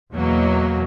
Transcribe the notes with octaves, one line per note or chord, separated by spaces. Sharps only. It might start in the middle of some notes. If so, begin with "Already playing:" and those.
E2 B2 F#3 A#3